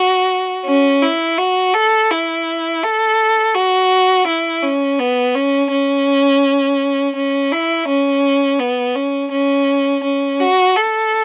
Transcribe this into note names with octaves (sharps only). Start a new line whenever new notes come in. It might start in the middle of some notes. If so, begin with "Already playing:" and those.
Already playing: F#4
C#4
E4
F#4
A4
E4
A4
F#4
E4
C#4
B3
C#4
C#4
C#4
E4
C#4
B3
C#4
C#4
C#4
F#4
A4